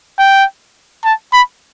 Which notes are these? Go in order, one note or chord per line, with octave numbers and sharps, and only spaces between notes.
G5
A5
B5